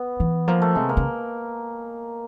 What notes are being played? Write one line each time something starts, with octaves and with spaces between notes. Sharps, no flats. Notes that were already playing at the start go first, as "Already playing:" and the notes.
Already playing: B3
E3
F3 A#3
A3
C3 G#3
A#3
C#3